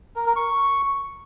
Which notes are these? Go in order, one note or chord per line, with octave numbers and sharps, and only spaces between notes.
A#4
A#4
C#6